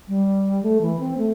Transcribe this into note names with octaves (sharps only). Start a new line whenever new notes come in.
G3
A3
E3
C4
A3